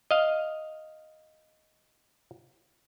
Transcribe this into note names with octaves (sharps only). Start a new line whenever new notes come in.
D#5 F5